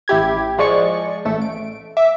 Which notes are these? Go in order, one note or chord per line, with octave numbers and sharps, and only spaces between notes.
A1 E4 G4 G#6
F3 G#3 D5 C#6 C#7
A1 A3 E7
D7
E5 D6